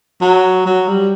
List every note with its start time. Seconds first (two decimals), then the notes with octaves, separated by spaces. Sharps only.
0.21 F#3
0.66 F#3
0.87 G3